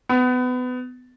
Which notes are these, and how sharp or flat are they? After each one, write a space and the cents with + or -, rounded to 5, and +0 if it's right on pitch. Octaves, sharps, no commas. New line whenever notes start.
B3 +25